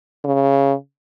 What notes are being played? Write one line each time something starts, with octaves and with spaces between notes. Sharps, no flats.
C#3